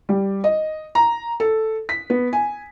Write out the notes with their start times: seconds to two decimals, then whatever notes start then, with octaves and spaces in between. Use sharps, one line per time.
0.09 G3
0.44 D#5
0.95 A#5
1.40 A4
1.89 B6
2.10 B3
2.33 G#5